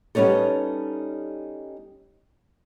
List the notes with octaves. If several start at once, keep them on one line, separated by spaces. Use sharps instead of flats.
G3 B3 C#4 D#4 A4